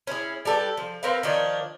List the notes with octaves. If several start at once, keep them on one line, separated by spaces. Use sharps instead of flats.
C#4 E4 G#4
G3 G4 A4 B4
F3
C4 A#4 B4 F5
D#3 F3 D4 C#5